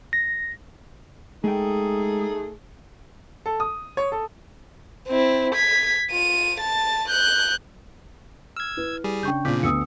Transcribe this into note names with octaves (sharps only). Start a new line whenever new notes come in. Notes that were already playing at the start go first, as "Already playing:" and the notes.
A#6
G#3 A3 D#4 G#4 G5
A4
D#6
C#5
A4
C4 E4
G#6 B6
F4 D#7
A5 A6
F#6 G6
E6 F6 G#6
E4 B4
G3 G#4
C#3 D4 G5 C#6 G6
A#2 C#3 C4 D4 F4 D6 G6 B6
D2 B3 D#6 E6 C#7